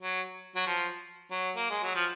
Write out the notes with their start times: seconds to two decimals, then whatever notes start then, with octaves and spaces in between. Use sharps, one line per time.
0.02 F#3
0.56 F#3
0.66 F3
1.31 F#3
1.56 A#3
1.70 G#3
1.83 F#3
1.95 F3